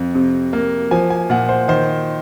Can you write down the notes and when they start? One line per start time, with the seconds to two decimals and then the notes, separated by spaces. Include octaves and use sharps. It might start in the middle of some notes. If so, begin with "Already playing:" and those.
Already playing: F2
0.15 C3
0.53 A#3
0.91 F3 G#5
1.10 G#5
1.30 A#2 F#5
1.49 C5
1.68 D#3 C5